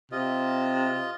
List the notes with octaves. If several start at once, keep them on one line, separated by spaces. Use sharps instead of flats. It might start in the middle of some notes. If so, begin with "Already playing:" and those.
C3 F4 D#5